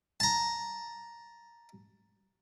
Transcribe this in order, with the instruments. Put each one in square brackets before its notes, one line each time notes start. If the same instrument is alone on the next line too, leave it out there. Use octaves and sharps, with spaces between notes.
[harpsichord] A5 A#5